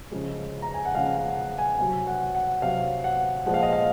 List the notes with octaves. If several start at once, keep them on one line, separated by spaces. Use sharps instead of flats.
C#3 F3 G#3
A#5
G#5
F#5
C#3 F3 G#3 F5
F#5
F#5
G#5
C3 F#3 G#5
F#5
F#5
C3 F#3 F5
F#5
A#2 F3 G#3 F#5
F5
D#5
F5